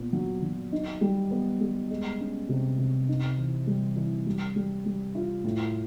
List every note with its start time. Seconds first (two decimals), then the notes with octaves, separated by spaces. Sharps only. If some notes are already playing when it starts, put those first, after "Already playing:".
Already playing: A#2 B3
0.13 F#3
0.42 F#3
0.72 D#4
1.01 G3
1.31 B3
1.61 G3
1.90 G#3
2.20 C#4
2.49 C3
2.79 C3
3.08 D#4
3.38 E3
3.67 G3
3.96 E3
4.26 G3
4.56 G3
4.86 G3
5.15 F4
5.44 A2